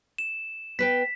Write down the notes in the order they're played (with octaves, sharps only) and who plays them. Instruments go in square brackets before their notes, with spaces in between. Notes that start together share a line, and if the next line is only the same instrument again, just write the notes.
[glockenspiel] E7
[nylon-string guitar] B3 B4 G5 [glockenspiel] B6